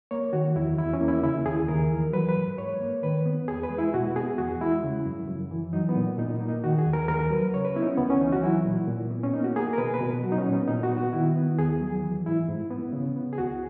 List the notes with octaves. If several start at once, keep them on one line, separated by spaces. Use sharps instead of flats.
A#3 C#5
D#3 F#4
E2 E4
E2 E4
C#4
A#3
E4
C#3 E4
D#2 G#4
D#2 A#4
E3
F#3 B4
B4
G#2
G#2 C#5
A#3
D#3 B4
B3
E2 G#4
B4
G#3
E4
B2 F#4
B3 G#4
E2 F#4
G#3 E4
C#3
F#2
F#2
E3
F#3 D#4
B3
A#2
A#2 D#4
A#3
D#4
D#3 F#4
G#4
D#2
A#4
D#2 A#4
F#3 B4
C#3 C#5
B4
B3 E4
D#4
C#4
C#2 B3
C#4
E3 D#4
F#4
F#3 E4
A#2
A#2
B3
C#4
A#3 D#4
F#4
A#3 G#4
A#4
B2 B4
B4
B2
F#3 F#4
D#4
C#4
A#2
B3
A#2 D#4
F#4
B3
F#4
D#3 E4
B3
D#2 G#4
F#3
E3
G#2 E4
G#2
B3
C#3
B3
G#4
C#2 F#4